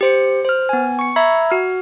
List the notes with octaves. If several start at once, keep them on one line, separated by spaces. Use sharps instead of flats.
G4 C5 C#7
C5 F6
B3 G#5
C#6 C#7
E5 A#5 B5 E6 G#6
F#4 F6